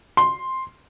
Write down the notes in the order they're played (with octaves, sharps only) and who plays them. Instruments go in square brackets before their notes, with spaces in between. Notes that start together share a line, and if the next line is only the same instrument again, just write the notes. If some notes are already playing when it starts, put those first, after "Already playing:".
[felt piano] C6